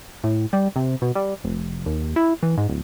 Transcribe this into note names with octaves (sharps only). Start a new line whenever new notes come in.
A2
G3
C3
B2
G3
F1
D#2
E4
E3
G#2
D1